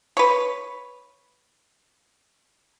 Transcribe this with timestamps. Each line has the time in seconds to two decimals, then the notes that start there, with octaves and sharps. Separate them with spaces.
0.17 B4 C#5